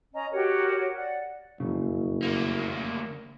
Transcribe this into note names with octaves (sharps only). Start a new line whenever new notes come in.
C#4 D#5 A#5
F#4 G4 A#4 C#5
D5 F#5
F#1 F2 A2 C#3
D2 A#3